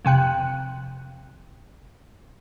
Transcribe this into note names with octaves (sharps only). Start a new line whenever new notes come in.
F2 C3 G5 F#6